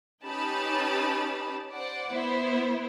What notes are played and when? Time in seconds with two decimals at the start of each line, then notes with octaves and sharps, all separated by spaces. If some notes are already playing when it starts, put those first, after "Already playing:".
0.24 C#4 D#4 G4 B4 A5 B5
1.72 C5 D5 F#5
2.10 B3 E4 C5